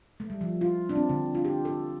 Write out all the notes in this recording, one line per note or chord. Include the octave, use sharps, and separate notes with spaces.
A3
G3
F3
F4
D4
C4
D3
F4
G4
A4